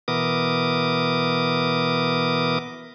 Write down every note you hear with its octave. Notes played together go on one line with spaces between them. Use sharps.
B2 E3 B3 A#4 D6 D#6